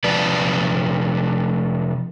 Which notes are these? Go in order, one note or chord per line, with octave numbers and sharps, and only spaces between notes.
C3 F3 D4 B4 D5 A5